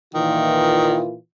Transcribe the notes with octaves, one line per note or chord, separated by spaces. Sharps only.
A#2 D#3 E3 F4